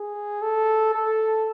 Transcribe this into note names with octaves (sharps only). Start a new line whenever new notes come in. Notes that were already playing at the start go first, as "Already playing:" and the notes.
Already playing: G#4
A4
A4